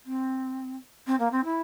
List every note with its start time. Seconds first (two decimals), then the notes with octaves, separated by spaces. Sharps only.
0.05 C4
1.06 C4
1.19 A#3
1.31 C4
1.44 E4